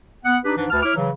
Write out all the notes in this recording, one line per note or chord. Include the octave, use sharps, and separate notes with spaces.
B3 F#5
D4 D#4 G4 B4
G#2 E3 D4
D2 B4 A5 F6
E4 C#5 D6 F6
C#3 E3 F#3